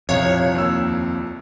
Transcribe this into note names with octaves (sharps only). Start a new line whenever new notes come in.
C2 F2 C#5 F5 G#6
D#2 E6